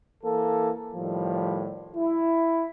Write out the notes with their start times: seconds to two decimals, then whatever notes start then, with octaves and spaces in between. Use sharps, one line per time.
0.24 E3 A#3 A4
0.93 A2 D#3 F3 G3
1.95 E4